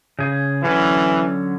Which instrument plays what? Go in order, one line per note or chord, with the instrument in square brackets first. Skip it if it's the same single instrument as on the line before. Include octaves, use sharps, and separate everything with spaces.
[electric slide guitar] C#3 G#4
[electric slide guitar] D3 F#3 C#4 [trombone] E3